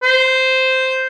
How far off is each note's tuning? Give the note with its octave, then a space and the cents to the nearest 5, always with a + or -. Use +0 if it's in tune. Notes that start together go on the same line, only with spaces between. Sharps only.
C5 -5